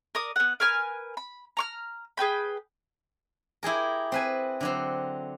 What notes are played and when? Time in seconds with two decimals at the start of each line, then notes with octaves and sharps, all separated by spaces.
0.15 A#4 D5 D#6
0.36 B3 F#5
0.60 A#4 B4 G#5 F6
1.17 B5
1.57 A#5 C#6 F6
2.17 G#4 B4 G5 B5
3.63 E4 G4 G#4 A#4
4.12 C4 B4 G#5
4.61 D3 F#3 C4